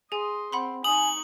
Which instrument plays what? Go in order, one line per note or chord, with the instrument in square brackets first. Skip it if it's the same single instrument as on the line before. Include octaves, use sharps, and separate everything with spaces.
[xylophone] G#4 G#5 [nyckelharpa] D#5 C6
[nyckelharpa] C4 [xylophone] F#5 B5 C6
[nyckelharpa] D#4 C#6 [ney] G#5 [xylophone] D#6 [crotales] F#7